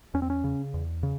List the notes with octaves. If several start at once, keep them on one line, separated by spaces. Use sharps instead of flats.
E2 C#4
C4
C#4
C#3
E2
C#3